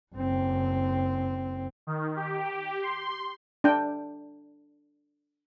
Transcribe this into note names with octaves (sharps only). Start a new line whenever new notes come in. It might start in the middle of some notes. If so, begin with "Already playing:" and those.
F#1 C4
D#3
G4
C6
D4 G5